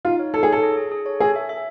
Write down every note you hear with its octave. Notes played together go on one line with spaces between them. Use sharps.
D#4 F4
C#5
D#4 A4
G#4
A4 C#5
G#4
G#4
G#4
C#5
G#4 A4
E5
E5